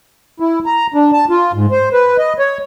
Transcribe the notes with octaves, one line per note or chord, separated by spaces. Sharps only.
E4
A#5
D4
A5
F4
G#2
C5
B4
D#5
C#5